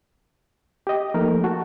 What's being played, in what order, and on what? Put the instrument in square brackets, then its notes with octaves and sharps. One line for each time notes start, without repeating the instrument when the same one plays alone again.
[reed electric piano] G4 D#5
[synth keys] F3 A#3 A4 [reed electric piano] A3 D#4 A#4
[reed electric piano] F#4 [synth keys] A5